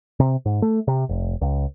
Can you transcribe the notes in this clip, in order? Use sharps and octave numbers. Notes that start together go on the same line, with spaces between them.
C3
G#2
A3
C3
F1
C#2